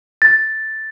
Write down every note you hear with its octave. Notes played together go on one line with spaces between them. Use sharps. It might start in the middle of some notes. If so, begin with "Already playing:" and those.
A6